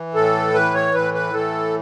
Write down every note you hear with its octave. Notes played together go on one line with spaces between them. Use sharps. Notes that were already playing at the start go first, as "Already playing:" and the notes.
Already playing: E3
A2 A4
E3 B4
C#5
A2 B4
B4
E3 A4